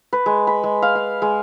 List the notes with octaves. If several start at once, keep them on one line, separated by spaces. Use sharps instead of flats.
B4
G#3
B5
G#3
F5
F5
G#3